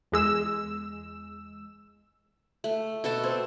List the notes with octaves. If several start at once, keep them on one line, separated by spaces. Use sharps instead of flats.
E2 G#3 E6
A3
B2 F#4 A4 A5
C4